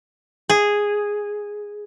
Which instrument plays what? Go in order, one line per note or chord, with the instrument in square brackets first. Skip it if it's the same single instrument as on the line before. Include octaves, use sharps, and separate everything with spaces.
[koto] G#4